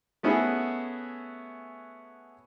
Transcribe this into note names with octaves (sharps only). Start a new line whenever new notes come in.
A3 B3 C#4 E4 F#4 G#4